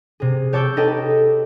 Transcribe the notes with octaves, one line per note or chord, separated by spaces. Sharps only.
C3 G#4
G4 C#5 A5 D6 E6 G6
D#4 A4 B4 D#5 G5 A5